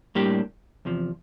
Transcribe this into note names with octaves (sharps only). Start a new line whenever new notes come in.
A2 G3 A#3 D4 G4
E2 C3 F3